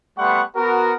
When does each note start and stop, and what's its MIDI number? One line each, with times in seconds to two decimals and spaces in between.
0.18 0.42 55
0.18 0.42 57
0.18 0.42 59
0.18 0.42 78
0.18 0.42 84
0.18 0.42 85
0.56 0.94 59
0.56 0.94 66
0.56 0.94 70